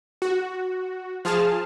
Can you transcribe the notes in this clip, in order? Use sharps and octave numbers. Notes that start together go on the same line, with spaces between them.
F#4
F3 F4 G#4 A5 F6